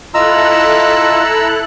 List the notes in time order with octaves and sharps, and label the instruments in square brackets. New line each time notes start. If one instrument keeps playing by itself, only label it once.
[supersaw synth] E4 A4 F#6 [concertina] F4 [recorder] D#5 [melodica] A#5 E6